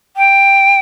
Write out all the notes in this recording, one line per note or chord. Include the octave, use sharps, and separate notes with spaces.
G5